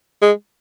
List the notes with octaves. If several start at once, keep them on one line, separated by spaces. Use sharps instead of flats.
G#3